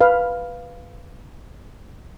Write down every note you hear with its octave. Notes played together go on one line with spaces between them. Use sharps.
B4 F5